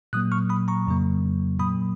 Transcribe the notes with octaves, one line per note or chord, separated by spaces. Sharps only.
A#2 F#3 A#3 D#6 F#6
C#6 F6
B5 D#6
A#5 C#6
F2 C#3 F#3 A#3
A#2 F#3 A#3 B5 D#6